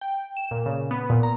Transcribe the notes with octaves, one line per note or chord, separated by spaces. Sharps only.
G5
E7
A#2
C#3
B3
A#2
A#5